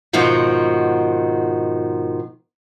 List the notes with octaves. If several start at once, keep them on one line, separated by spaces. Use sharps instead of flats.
G#2 B2 D#3 F3 F#4